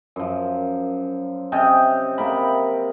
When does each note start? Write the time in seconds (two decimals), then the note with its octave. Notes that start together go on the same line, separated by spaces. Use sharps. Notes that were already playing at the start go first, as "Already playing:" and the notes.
0.16 F#2 F3
1.52 C3 C#4 D#5 G5
2.18 C3 A#3 A#4 B5